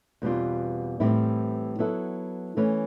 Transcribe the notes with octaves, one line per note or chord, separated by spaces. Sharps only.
E2 B2 G3 C4 F4
A2 E3 G3 C4 E4
F#3 B3 E4 A4
E3 A3 C#4